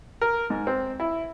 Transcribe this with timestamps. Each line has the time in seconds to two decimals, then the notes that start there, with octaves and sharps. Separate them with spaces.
0.21 A#4
0.50 G#2
0.67 C4
1.00 E4